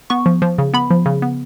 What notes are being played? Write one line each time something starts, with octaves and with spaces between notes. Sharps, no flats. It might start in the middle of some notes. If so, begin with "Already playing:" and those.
B3 C#6
F3
F3
C#3
B3 B5
F3
C#3
B3